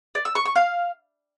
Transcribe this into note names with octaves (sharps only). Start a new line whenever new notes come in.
D5
E6
C#6
C#6
F5